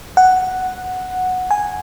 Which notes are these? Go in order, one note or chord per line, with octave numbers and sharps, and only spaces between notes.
F#5
G#5